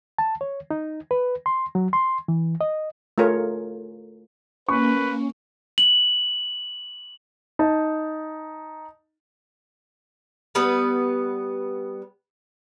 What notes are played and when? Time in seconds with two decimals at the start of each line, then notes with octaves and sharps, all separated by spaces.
0.18 A5
0.41 C#5
0.71 D#4
1.11 B4
1.46 C6
1.75 F#3
1.93 C6
2.28 E3
2.61 D#5
3.18 A3 F4 G#4 A#4 C#5
4.69 A#3 C#4 B4 C#6
5.78 F#7
7.59 D#4 A5
10.55 G3 B3 B4